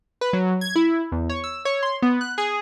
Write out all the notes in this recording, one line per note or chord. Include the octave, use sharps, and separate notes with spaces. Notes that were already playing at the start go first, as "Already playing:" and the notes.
B4
F#3
G#6
E4
E2
C#5
E6
C#5
C6
B3
F#6
G#4